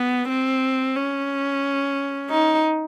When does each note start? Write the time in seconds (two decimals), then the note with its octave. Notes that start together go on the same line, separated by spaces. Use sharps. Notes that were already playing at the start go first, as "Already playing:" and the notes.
Already playing: B3
0.29 C4
0.96 C#4
2.30 D#4